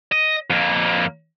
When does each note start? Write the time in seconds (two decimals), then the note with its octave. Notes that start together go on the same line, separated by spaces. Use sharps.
0.12 D#5
0.50 F2 A#3